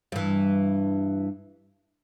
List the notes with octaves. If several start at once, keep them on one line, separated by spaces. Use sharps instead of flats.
G2 E3